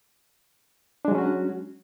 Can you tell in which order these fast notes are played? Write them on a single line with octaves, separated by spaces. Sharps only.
D4 G#3 F#3 C#4 F#4